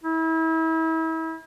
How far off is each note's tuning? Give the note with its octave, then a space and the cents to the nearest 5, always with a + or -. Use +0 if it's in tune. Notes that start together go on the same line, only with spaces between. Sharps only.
E4 -35